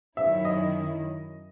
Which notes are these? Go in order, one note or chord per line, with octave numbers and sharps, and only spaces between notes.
F#2 D#3 F#3 C#4 E4 E5
D#5